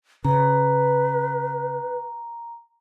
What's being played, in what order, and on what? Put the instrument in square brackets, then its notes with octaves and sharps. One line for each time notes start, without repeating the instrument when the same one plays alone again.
[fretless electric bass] C#3 [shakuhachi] B4 [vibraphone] A#5